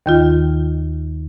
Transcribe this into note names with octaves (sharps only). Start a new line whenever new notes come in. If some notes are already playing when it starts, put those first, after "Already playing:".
D#2 D#3 F4